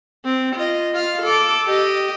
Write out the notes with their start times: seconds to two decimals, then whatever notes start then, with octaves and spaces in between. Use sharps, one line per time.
0.25 C4
0.55 F4 D#5
0.93 F4 F5
1.22 A4 D6
1.67 G4 D#5